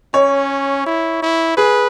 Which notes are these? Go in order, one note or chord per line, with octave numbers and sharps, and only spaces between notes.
C#4 C#5
E4
E4
G#4 B4